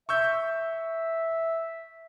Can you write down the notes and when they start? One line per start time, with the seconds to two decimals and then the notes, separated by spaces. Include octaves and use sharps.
0.09 E5 C#6 E6 G6